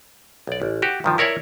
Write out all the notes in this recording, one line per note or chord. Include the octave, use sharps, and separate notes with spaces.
B1 D5
A1
F#4 G4
G2 D#3 F3
E4 A#4 C#5 D5 E5